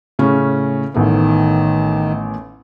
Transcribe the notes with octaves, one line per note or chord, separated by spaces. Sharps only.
A2 C#3 C#4
A1 A2 D#3 B3